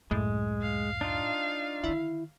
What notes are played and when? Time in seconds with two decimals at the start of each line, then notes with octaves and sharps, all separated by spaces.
0.11 C#2 F#2 A2 G#3
0.63 F5
1.01 D4 D#4 F4
1.84 D3 D#3 E4